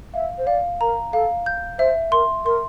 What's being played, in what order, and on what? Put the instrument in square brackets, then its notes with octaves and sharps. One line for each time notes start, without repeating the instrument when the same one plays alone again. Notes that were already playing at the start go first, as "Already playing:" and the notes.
[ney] E5 [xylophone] F5
[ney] C5
[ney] D5 [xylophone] F5
[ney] A#4 [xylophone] A#5
[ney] A4 [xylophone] F5
[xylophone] G6
[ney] C5 [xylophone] E5
[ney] A#4 [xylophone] C6
[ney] A#4 [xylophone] C6